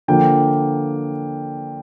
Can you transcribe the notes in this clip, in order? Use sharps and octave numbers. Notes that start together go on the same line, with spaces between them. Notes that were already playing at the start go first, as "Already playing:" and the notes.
D3 F3 A#3 G5